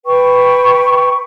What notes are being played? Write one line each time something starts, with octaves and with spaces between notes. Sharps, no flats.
B4 G5 C#6